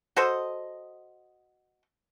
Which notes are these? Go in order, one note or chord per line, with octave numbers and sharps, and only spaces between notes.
F#4 A4 C5 D#5